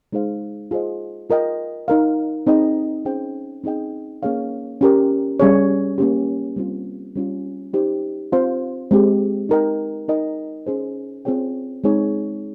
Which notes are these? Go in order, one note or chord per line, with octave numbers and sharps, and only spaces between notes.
G#3 D#4 G#4 C5 F5
F4 G#4 C5 D#5
F4 A#4 D#5 G5
D#4 A#4 F5
C4 D#4 G#4 D#5 G5
C#4 G#4 C5 G5
C4 D#4 G#4 D#5 G5
A#3 C#4 G#4 C#5 F5
C#4 G4 A#4
G3 C#4 G#4 C#5
A#3 C#4 G4
G3 C4 F4
G3 C#4 F4
D#4 G4 C5
C4 F4 C5 F5
G#3 C4 G4
D#4 A#4 D#5 G5
D#4 A#4 D#5 G5
C#4 G#4 C5
C4 F4 G#4 C#5 G5
G#3 C4 D#4 G#4 C#5